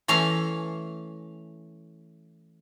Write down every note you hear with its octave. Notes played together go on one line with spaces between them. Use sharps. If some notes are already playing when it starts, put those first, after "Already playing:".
E3 A3 C#4 F5 A#5